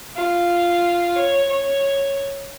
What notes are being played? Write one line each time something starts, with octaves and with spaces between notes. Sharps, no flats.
F4
C#5
C#5